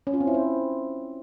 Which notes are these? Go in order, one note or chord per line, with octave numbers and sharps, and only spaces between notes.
C#4
F4
C4
E4
C5